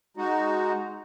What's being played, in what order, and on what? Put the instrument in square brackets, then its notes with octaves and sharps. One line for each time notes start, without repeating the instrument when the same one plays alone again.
[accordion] G#3 D#4 F#4